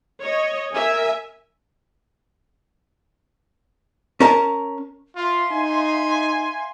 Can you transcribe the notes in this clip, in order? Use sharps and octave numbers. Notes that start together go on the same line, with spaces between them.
C#5 D#5
A#4 E5 G#5
C#4 A#4 A5
F4 E5 F5 C6
D#4 G#5